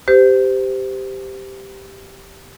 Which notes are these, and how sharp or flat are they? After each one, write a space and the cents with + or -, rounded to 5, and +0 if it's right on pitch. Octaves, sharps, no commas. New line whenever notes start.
G4 +0 C5 -25